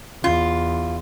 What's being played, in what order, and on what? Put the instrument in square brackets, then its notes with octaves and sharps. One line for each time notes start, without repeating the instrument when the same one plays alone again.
[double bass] E2 [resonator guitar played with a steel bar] F4